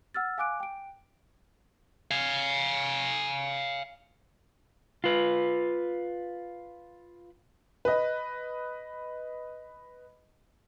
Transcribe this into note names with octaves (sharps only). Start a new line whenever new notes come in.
F#5 E6 F6 A6
F5 G#5 D6 F#6 D7
G5 D7
F5 G#5
F4 B4
B4 D#5